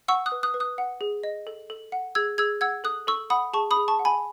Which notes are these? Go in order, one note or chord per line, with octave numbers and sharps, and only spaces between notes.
F#5 C#6 E6
D#6 F#6
B4
D#6 F#6
B4
D#6 F#6
F#5
G#4
D#5
A4
A4
F#5
G#4 E6 G#6
G#4 E6 G#6
F#5 E6 G#6
A4 D#6 F#6
A4 C#6 E6
F#5 B5 D#6
G#4 A5 C#6
B5 D#6
G#4
A5 C#6
F#5
G#5 B5